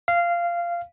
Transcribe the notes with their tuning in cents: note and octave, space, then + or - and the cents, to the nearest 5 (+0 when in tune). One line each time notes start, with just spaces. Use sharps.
F5 -15